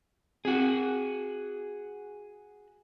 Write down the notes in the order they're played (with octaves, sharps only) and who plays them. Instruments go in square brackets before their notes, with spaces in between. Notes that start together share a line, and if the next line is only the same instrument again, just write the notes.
[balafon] C4 [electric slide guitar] F#4 G#4